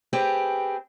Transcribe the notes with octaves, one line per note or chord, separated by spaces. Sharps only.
C4 G4 G#4 B4